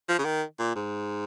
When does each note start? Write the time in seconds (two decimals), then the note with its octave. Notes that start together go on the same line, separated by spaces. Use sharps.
0.08 F3
0.18 C#3
0.24 D#3
0.59 A#2
0.75 G#2